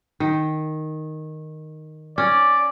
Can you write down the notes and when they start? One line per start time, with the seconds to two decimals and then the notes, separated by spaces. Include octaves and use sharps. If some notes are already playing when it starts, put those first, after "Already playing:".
0.20 D#3
2.18 C#4 D5